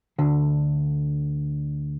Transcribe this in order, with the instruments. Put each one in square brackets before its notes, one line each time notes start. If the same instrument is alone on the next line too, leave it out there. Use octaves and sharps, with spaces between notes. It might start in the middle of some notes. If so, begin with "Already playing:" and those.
[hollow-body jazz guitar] D2 D3